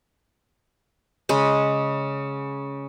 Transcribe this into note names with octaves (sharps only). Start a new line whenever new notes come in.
C#3 G#3